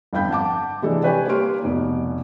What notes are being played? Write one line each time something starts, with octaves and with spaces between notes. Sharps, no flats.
G1 F2 F5 G5 B5 G6
F#5 A5 D6
C3 E3 G#3 D4 A4
G4 B4 C#5 D5 G5 G#5
G3 A#3 C#5 C6 F6 D7
F1 B2 D#4